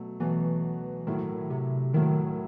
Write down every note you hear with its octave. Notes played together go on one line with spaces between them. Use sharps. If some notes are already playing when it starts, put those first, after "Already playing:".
Already playing: B2 F#3 A3
B2 E3 F#3 A3
A2 D#3 F#3 A3 E4
C3
A2 D#3 F#3 A3 E4